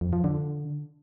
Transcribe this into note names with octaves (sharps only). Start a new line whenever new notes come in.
F2
F3
D3